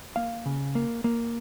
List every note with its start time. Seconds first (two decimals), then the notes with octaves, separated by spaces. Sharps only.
0.16 A#3 F5
0.46 C#3
0.75 A#3
1.04 A#3